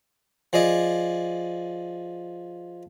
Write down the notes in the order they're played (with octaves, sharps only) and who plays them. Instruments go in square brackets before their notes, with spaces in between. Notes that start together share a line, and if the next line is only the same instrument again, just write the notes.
[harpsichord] F3 G#4 D5 D#5